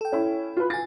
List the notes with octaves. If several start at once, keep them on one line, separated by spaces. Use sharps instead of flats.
A4 G5
C#4 E4
F4 B4
F4 G#5 A6